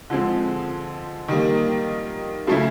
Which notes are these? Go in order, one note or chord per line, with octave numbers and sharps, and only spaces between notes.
D3 F3 G#3 C4
D#3 G3 A#3
C#3 F#3 A3 C#4 E4